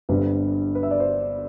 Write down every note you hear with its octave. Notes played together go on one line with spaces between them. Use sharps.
G1 G2 D3 G3 C4 B4
B4
E5
D5
C5